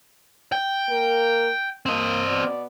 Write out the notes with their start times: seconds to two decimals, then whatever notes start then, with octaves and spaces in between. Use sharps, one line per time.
0.52 G5
0.89 A#3 A#4
1.86 A#3 C4 D#5
2.26 B2 B3 D5